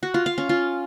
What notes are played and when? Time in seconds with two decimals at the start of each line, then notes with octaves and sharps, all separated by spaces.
0.03 F#4
0.14 F4
0.26 F5
0.38 C#4
0.49 F4